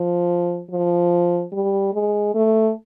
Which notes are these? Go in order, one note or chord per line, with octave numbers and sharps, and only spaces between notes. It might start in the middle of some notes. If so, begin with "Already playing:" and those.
Already playing: F3
F3
G3
G#3
A3